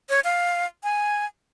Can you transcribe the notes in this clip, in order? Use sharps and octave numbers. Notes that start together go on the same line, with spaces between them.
C#5
F5
G#5